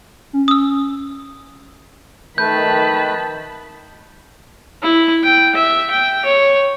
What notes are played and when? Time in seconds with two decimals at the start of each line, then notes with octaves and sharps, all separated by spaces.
0.33 C#4
0.48 C#4 D#6 E6
2.38 D#3 A3 B4 A5 B5 G6
4.83 E4
5.24 G5
5.55 E5
5.91 G5
6.26 C#5